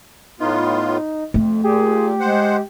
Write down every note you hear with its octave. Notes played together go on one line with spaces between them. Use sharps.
A2 B3 D#4 F4
F2 A3
A#2 G4 G#4
G#3 C5 F#5